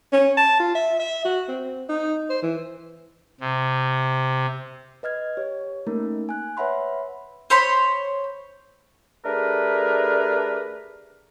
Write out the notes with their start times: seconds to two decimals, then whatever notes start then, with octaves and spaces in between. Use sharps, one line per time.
0.13 C#4
0.37 A5
0.60 F4
0.75 E5
1.00 E5
1.25 F#4
1.48 C4
1.89 D#4
2.30 C5
2.42 E3
3.41 C3
5.03 B4 D#5 F6 G#6
5.37 G4 C#5
5.87 A3 A#3 C#4 D#4 A#4
6.29 G#5 F#6
6.57 B4 C#5 E5 F#5 B5 C6
7.50 C5 C#5 B5 C6
9.24 A3 D4 G4 G#4 A#4 B4